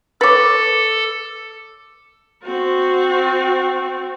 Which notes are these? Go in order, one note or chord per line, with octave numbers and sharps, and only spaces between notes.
A4 B4 C#5 D6 A6
C4 F#4